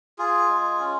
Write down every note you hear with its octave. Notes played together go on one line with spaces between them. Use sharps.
F4 G#4
G#3
C#4